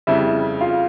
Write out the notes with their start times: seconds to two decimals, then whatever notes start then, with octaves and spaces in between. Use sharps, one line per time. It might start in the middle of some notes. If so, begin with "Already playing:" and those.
0.07 F2 C#3 G3 E4 E5
0.61 F4 F5